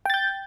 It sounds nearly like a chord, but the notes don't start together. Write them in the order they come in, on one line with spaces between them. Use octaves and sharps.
G5 A6 G6